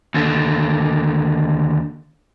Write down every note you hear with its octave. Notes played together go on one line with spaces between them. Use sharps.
D#2 D3